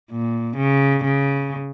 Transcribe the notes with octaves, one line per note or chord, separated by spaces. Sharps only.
A#2
C#3
C#3